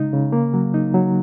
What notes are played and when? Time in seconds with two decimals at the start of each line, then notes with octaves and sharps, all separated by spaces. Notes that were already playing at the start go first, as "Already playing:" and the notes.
Already playing: C#3 G#3 D#4
0.13 C#3
0.32 A#3
0.54 F#3
0.74 D#4
0.94 F#3